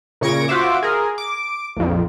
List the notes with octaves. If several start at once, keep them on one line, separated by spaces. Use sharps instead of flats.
A#2 C#3 C#6 G#6 A#6 D7
F4 F#4 C5 E5 D6
G#4 A#4
D6
A#1 F2